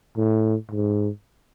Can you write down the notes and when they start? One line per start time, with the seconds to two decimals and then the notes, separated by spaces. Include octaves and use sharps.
0.17 A2
0.71 G#2